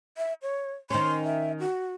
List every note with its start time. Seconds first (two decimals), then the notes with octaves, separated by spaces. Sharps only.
0.17 E5
0.42 C#5
0.90 D#3 C#4 C6
1.24 E5
1.60 F#4